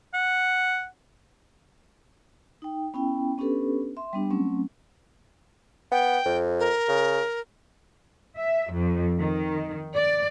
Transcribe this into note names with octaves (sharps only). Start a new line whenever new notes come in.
F#5
D#4 G5
B3 C#4 E4 G5
B3 C#4 D4 G4 A4 B4
E5 C6
G3 B3 D4 G4
F#3 A3 C4 C#4
B3 G5
F2
A#4
C#3
E5
F2
D#3
D5